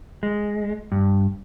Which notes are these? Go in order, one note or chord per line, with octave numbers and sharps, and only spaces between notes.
G#3
G2